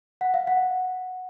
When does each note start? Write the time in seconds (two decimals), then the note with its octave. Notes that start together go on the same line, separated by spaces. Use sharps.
0.21 F#5
0.34 F5
0.47 F#5